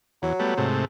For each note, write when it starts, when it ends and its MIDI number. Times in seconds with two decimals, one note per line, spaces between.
0.22 0.33 40
0.22 0.68 54
0.39 0.54 55
0.39 0.54 57
0.39 0.54 59
0.57 0.85 44
0.57 0.85 48
0.57 0.85 57